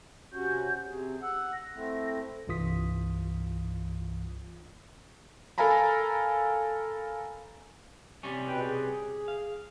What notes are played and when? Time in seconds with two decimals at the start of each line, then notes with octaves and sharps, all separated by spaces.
0.33 C3 C#4 F#4 G6
0.87 C3 G#4
1.22 F#5 E6
1.52 A#6
1.75 A3 C4 E4
2.47 C2 G2 E3 F4 D#6 B6
5.58 A4 A#4 F5 G#5 A#5 B5
8.23 C3 G3 C#4
8.47 B2 B4 G5
8.61 G#4
9.28 F5